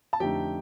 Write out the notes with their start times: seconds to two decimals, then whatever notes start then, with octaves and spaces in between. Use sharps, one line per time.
0.13 A5
0.20 F2 D3 A3 D#4 G4 G5